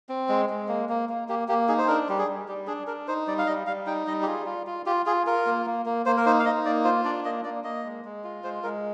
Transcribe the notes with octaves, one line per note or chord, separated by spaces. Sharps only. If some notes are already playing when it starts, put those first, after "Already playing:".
C4
G#3
G#3
A#3
A#3
A#3
A#3 G4
A#3 G4
D#4 G#4
C5
D4 A#4
G3 G4
G#4
G3
G3 G4
D4 G#4
D4 A#4
D#4 C5
G3 D5
F5
G3 D#5
G3 F5
D#4 G5
G3 D#5
G4
F4 G#4
F4
F4
F4 G4
F4 G#4
F4 A#4
A#3
A#3
A#3
A#3 C5
A#4
D#4 C5
F5
D#4 D#5
A#3 D5
F4 C5
D4 D5
A#3 D#5
A#3 D5
A#3 D#5
G#3
G#3
F4
G#3 C5
G#3 A#4